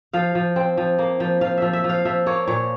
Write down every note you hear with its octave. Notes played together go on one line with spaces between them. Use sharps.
F3 F5
F3
C4
F3
A#3
F3
F3 F5
F3 E5
E5
F3
F5
F3 E5
A#3 C#5
A#2 C#5